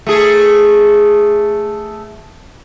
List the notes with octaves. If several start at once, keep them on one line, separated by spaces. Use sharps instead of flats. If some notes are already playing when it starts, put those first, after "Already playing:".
A3 G#4